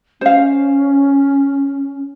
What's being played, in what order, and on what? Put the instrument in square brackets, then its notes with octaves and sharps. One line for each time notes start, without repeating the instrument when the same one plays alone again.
[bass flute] C#4 [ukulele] C5 F5